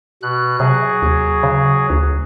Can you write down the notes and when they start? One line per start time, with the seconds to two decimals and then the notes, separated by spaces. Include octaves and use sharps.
0.22 B2 F#6
0.60 C3 F#3 G#4
1.02 D#2
1.43 C#3
1.90 D2